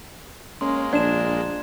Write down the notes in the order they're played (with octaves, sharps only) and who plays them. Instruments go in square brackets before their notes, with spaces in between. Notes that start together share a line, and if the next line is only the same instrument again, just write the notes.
[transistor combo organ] G#3 A#3 [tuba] C#4 [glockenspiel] C6
[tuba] A#1 [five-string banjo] D4 [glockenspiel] G#6 E7